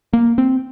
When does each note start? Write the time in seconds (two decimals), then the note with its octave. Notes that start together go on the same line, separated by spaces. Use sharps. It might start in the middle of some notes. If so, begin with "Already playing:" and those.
0.13 A#3
0.38 C4